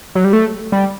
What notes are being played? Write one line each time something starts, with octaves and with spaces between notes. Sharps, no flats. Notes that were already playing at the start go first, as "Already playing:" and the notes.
F#3
G3
A3
G3